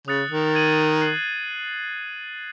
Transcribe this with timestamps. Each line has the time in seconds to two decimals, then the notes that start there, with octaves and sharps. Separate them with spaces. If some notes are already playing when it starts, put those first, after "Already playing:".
0.07 C#3 D#6 F#6 A6 C#7 F#7
0.31 D#3
0.55 G#6 D#7 F#7
1.01 F#6 C7 F#7